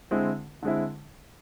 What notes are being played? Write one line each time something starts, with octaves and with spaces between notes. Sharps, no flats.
D3 G#3 C4 E4
D3 G#3 C4 E4